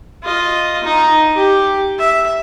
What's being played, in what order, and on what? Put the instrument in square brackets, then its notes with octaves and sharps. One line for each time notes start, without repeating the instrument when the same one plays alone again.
[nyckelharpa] F4 D#5
D#4
G4
E5